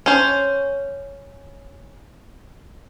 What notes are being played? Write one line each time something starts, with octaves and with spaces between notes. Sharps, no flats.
C#4 C5